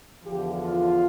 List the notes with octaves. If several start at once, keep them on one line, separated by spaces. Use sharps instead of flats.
E2 D3 F3 G4
F4